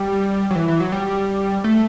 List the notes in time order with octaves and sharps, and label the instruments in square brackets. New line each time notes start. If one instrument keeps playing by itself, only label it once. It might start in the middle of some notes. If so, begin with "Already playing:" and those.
Already playing: [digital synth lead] G3
F#3
E3
E3
F#3
G3
A3